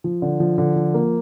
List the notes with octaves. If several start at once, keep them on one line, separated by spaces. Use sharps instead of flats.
F3
D3
F3
D3
F3
A#3